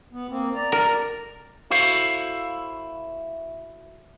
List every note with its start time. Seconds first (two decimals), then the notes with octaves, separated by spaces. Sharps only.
0.12 B3
0.29 A#3 C4
0.55 D5 A#5
0.72 A#4
1.70 E4 F#4 A4 C5 F5